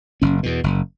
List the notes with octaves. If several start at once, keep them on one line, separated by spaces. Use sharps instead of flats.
F#1 C#4
E2 B2
F#1